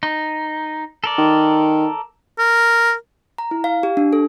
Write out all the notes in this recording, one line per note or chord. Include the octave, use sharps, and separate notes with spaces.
D#4
A4 A#4 D5
D#3
A#4
A#5
E4
F5
G4
D4
A4